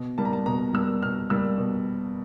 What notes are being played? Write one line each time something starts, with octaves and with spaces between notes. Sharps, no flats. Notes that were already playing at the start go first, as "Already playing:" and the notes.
Already playing: B2
G3 A#3 A5
A#5
A5
B2 A#5
G3 A#3 E6
B2 F6
G3 A#3 E6
B2